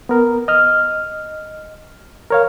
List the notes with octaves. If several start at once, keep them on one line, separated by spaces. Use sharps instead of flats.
B3 A#4
D#5 F6
A#4 C#5 F5